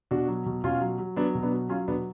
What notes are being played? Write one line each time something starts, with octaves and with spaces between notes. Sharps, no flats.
B2 D4 F#4
F#3
B2
B2 C#4 F4
F#3
F#3
F#3 B3 D4
B2
B3 D4
F#3
F#3 C#4 F4
B2 B3 D4